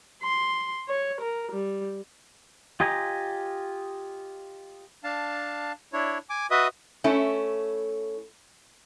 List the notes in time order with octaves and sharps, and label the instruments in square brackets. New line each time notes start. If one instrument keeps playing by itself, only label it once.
[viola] C6
C#5
A#4
G3
[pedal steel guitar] F4 G4 D#5 G#5 A#5
[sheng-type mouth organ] D4 F5 A5
D4 E4 C#5
G#5 D6
F#4 B4 D#5 E5 D#6
[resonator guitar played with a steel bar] A3 C#4 E4